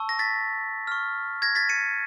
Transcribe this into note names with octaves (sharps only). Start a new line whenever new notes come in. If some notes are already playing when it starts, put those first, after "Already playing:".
Already playing: A5 C#6 E6
A#6
A6 B6
C#6 F6
G#6 A#6
A6 B6
C#7 D#7